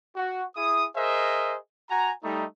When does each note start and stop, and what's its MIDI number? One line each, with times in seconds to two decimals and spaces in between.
0.16 0.44 66
0.56 0.86 64
0.56 0.86 68
0.56 0.86 87
0.96 1.56 68
0.96 1.56 70
0.96 1.56 72
0.96 1.56 75
0.96 1.56 76
1.89 2.12 66
1.89 2.12 80
1.89 2.12 82
2.24 2.42 55
2.24 2.42 57
2.24 2.42 63